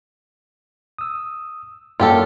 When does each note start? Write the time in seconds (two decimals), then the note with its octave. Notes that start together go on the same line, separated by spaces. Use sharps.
0.99 D#6 E6
2.00 F#2 A#3 F4 G4 A4 F#5